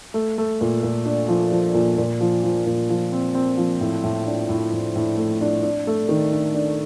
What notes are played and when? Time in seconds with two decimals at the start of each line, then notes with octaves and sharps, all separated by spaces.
0.14 A3
0.38 A3
0.61 A#2
0.83 A#2
1.06 D4
1.28 F3
1.51 F3
1.74 A#2
1.98 A#2
2.21 F3
2.43 F3
2.66 A#2
2.90 F3
3.12 C4
3.35 C4
3.57 F3
3.81 A2
4.04 A2
4.27 D4
4.49 A2
4.73 A2
4.96 A2
5.17 A3
5.41 D4
5.63 D4
5.87 A3
6.09 D#3
6.32 D4
6.55 D4